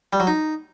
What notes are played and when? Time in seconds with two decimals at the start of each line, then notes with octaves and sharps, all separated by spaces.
0.13 G3
0.20 F#3
0.27 D#4